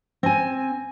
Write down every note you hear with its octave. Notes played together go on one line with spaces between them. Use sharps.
C4 G#5